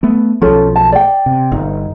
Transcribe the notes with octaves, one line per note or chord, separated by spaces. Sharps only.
A3 B3
B1 F3 C#4 A4
A5
D5 G5
C3
G1 D#4